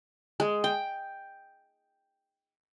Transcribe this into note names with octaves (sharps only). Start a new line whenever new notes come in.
G#3
G5